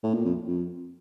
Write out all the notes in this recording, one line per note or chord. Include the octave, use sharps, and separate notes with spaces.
A2
A#2
F2
F2